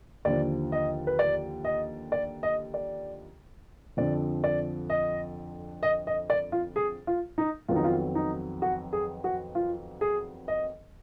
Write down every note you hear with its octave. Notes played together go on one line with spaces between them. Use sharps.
D#2 D3 F3 D5
D#5
B4
D5
D#5
D5
D#5
D5
F2 D3 F3 D5
D5
D#5
D#5
D#5
D5
F4
G#4
F4
D#4
F2 D#3 F#3 B3 F4
D#4
F4
D#4
F#4
G#4
F#4
F4
G#4
D#5